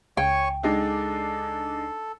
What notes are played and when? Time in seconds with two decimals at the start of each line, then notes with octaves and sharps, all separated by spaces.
0.17 C#2 C#5 G5 G#5 C#6
0.63 G#3 D4 D#4 A4